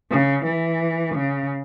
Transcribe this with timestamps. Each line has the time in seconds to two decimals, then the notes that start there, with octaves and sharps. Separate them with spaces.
0.11 C#3
0.46 E3
1.15 C#3